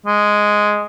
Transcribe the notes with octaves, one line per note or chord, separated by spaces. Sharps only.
G#3